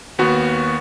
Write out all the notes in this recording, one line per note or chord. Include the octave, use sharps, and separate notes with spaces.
D#2 B3 F#4